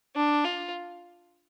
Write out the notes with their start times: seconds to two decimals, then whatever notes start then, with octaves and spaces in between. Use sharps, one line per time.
0.16 D4
0.44 F4